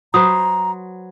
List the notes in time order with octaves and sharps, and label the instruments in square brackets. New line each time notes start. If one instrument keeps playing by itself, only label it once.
[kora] F#3 B4 C5 [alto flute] A#5 [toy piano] D#6